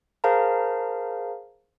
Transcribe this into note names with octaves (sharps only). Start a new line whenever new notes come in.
G#4 A#4 C5 F5 A5 A#5